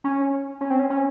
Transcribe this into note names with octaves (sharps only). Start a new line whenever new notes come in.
C#4
C#4
C4
C#4
C#4